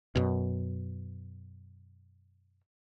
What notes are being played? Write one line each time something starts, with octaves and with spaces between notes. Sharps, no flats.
F#2 B2